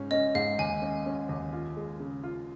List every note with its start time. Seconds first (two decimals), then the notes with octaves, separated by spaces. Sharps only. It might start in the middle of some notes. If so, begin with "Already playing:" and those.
Already playing: G#2 C#4
0.11 C#4 D#5
0.35 G#2 F5
0.59 D#2 G#5
0.82 C#4
1.06 C#4
1.29 D#2
1.53 F4
1.77 G#3
2.00 C#3
2.23 F4